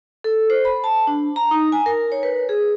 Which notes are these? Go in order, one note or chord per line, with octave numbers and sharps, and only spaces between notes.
A4
C5
B5
A5
D4
A#5
D#4
G#5
A#4
C#5
B4
G#4